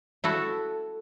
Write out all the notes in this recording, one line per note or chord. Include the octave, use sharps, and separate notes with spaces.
E4 F#4 A4